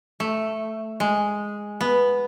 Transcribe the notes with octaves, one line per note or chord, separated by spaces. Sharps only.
A3
G#3
B3